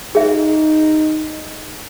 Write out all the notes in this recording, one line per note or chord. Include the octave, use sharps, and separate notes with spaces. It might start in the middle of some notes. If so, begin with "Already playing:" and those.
D#4 G#4 E5